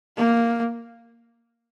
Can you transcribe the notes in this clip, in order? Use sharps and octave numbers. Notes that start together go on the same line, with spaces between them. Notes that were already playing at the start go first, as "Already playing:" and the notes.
A#3